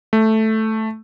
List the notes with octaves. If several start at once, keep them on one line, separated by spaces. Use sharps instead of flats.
A3